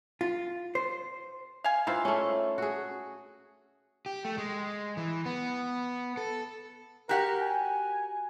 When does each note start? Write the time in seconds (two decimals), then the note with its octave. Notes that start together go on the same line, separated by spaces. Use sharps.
0.21 F4
0.75 C5
1.64 F5 G#5
1.87 D#3 E3 E4 F4 C5
2.05 A3 C#4
2.58 F#4 G#4
4.06 G4
4.25 A3
4.38 G#3
4.97 E3
5.26 B3
6.17 A4
7.09 F#4 G4 A#4 F#5
7.42 G#5